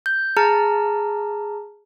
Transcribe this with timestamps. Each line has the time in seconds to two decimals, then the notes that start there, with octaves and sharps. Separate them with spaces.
0.06 G6
0.37 G#4 A5 A#5 F6